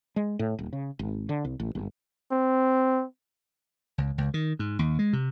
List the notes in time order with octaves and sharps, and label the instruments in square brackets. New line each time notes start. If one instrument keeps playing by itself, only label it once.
[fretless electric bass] G#3
A2
D#1
C#3
G#1
D3
C2
A1
G1
[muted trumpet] C4
[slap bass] C#2
C#2
D#3
G#2
D#2
G#3
C3